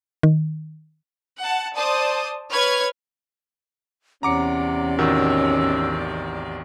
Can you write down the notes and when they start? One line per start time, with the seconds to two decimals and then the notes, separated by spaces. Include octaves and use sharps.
0.23 D#3
1.40 F#5 A5
1.76 C5 D5 A5 D#6
2.51 B4 C#5 F6 G#6
4.23 E2 C3 C#4 D5 F#5 A#5 D6 C#7
4.98 A1 D#3 F#4 E6